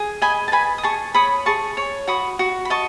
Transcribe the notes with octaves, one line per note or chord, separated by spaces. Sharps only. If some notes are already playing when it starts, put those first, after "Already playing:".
Already playing: G#4
D#5 G#5 B5
A5
B4 G#5 B5
D#6
G#4 A5 C#6
C#5 B5 D#6
G#4 A5 C#6
C#5
F#4 B5 D#6
F#4
B5
D#5 A5 C#6